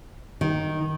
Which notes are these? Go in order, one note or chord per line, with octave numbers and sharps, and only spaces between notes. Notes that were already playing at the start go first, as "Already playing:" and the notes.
D#3